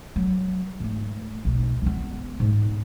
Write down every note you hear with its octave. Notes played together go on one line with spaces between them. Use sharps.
F#3
G#2 A3
B1 D#4
C#2 B3
G#2